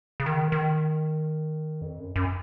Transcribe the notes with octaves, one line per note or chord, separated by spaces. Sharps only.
C#3
D#3
D#3
F2
F#2
F#2